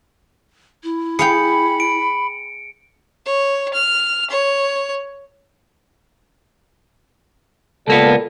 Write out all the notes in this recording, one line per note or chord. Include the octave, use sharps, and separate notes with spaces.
E4
G#4 F5 G5 B5 C#7
D7
C#5
F6
C#5
C#2 A#2 G3 A#3 B3 A4